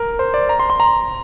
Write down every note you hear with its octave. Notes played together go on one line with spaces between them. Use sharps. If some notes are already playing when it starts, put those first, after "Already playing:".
Already playing: A#4
C5
D5
A#5
C6
C6
A#5